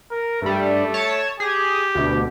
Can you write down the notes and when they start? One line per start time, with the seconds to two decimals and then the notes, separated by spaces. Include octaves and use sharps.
0.10 A#4
0.42 G2 G3 A3
0.94 C#5 A5
1.40 G4 G#4
1.95 D2 B2